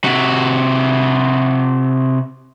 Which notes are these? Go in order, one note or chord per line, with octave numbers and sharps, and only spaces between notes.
C3 F#4